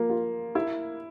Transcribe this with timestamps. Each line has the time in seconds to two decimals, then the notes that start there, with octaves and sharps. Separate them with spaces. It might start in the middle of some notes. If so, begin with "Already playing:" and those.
Already playing: F3 A#3
0.10 F4
0.55 E4